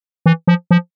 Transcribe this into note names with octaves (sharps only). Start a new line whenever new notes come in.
E3
F3
F3